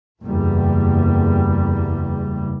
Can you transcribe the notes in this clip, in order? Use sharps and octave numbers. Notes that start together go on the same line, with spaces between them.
F#1 E2 G3